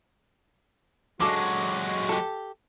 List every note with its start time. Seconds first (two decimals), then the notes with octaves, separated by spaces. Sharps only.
1.20 F#3 G#3 D4 F#4 A4 F5 D6
2.09 G4 A4